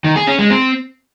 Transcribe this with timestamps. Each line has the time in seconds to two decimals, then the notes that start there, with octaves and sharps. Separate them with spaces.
0.04 D#3
0.16 G#4
0.27 C#4
0.39 G#3
0.50 C4